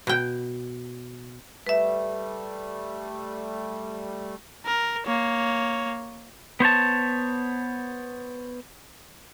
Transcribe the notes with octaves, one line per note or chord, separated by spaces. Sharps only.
B2 G5
G3 A3 B4 E5
A#4
A#3 C#5
B3 C5 C#5 A5